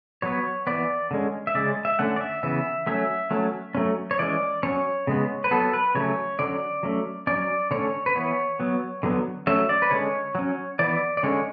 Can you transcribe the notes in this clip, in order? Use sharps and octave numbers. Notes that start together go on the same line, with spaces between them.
F#3 B3 C#5
E3 B3 D5
D3 G#3 C#4
E5
C#3 G#3 C#4 D5
E5
D3 A3 C#4 F#5
D5
E5
C#3 E3 B3 E5
F#3 A3 C#4 E5
F#3 A3 C#4
F#3 A3 C#4
C#5
E3 G#3 C#4 D5
F#3 C#4 C#5
C#3 G#3 B3
B4
F#3 B3 A4
B4
C#3 F#3 A3 C#4 C#5
D3 F#3 C#4 D5
F#3 A3 C#4
F#3 C#4 D5
D3 A3 C#4 C#5
B4
E3 B3 C#5
F#3 B3
D3 F#3 B3
F#3 A3 C#4 E5
D5
B4
D3 G#3 C#4 C#5
F#3 C#4
E3 B3 D5
D5
D3 G#3 C#4 C#5